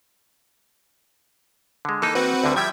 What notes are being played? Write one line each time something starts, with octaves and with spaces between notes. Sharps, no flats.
D3 G#3
E3 A#3 D#4 A4
C4 F#4 B4
D2 D3 G3
F3 G3 E5 G5 G#6